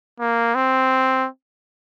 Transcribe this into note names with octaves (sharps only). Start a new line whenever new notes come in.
A#3
C4